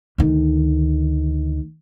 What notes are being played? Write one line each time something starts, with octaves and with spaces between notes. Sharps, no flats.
D2 D#3